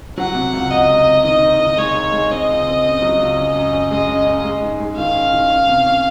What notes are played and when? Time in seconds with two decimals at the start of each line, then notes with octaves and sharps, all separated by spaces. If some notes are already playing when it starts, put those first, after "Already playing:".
0.18 F#3 F#5
0.35 C3
0.53 C#2
0.71 C#2 D#5
0.89 C#2
1.06 C3
1.24 D#3 D#5
1.42 D#4
1.60 D#3
1.77 G#3 C#5
1.95 D#4
2.12 G#3
2.31 C4 D#5
2.49 C#2
2.67 C4
2.84 C#3
3.02 F#3
3.20 C#2
3.37 C#4
3.55 F#2
3.73 C#4
3.91 G#3 D#5
4.09 C#3
4.27 C#4
4.44 G#3
4.62 G#2
4.80 G#3
4.98 D#3 F5
5.16 C#4
5.34 D#3
5.50 C#4
5.69 C3
5.86 C#4